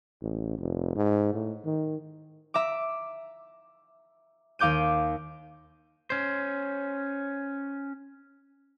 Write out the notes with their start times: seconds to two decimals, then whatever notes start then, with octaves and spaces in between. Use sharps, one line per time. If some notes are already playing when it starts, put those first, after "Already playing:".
0.22 A1
0.58 F1
0.96 G#2
1.34 A2
1.65 D#3
2.54 E5 A#5 D6
4.59 D#2 F5 D6 G6 D#7
6.10 C#4 C5